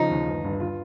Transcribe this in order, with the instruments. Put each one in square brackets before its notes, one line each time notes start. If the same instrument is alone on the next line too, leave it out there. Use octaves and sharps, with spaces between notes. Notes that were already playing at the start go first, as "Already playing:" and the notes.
Already playing: [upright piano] C#3 F3 [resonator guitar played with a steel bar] D#4
[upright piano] D#2
G1
G2
F4